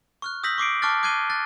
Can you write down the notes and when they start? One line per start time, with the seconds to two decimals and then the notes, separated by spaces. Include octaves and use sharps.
0.22 C#6 F6 F#6
0.43 D#6 E6 G6 A#6 B6 F#7
0.58 C#6 D6 C7 D7
0.82 A5 C#6 D6 F6 F#6 A6
1.03 D6 F#6 G#6 C7 D#7 G7
1.30 F#6 A6